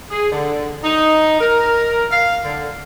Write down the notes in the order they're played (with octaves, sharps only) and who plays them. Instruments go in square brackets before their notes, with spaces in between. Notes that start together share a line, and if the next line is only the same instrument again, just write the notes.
[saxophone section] G#4
D3
D#4
A#4
F5
D3